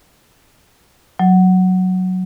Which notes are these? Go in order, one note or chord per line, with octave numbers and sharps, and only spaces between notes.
F#3